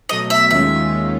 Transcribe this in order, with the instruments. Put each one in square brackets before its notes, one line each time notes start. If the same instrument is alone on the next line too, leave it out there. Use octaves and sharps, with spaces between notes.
[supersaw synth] B2 F#3 A3 [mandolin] D#5
[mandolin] E5
[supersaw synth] D#2 D#3 G#3 C#4 F4 [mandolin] E5